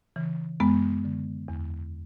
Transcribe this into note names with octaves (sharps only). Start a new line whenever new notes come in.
C#3 E3
F#2 G#3 B3
D3
E2